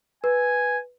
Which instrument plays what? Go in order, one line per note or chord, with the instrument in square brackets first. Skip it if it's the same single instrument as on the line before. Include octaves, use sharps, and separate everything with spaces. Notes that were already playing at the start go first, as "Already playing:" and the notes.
[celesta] B4 [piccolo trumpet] G#5